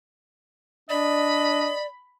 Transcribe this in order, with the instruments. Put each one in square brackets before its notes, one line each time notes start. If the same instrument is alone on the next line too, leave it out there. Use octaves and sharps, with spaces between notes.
[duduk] D4 [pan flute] D5 [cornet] D#5 [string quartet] B5